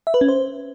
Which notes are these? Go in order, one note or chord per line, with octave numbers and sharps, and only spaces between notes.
E5
B4
C#4
C5